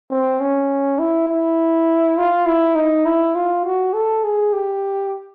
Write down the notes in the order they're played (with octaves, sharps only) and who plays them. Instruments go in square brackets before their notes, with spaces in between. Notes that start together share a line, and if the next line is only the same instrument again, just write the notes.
[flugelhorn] C4
C#4
E4
E4
F4
E4
D#4
E4
F4
F#4
A4
G#4
G4